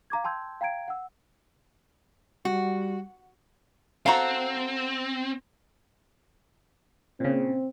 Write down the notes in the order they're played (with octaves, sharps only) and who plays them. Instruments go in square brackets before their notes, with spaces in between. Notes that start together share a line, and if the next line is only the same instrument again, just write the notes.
[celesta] F5 A#5 D6 G#6
G5 A5 C6 E6 G6 G#6
F5 G5 A#5 G#6 D7
F#5 E6
[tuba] G3 [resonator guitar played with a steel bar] F#4
[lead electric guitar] C4 [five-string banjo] F#4 A4 [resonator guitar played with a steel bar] F5 A#5
[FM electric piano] A#2 C#3 [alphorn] C4